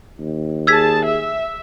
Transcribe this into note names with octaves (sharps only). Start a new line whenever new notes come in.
D#2
G#4 A5 E6 G#6 B6
E5